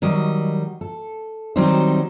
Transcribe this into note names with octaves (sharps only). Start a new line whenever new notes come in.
D#3 F#3 G3 D#5
A4
D#3 F#3 G3 C4 D#4 C5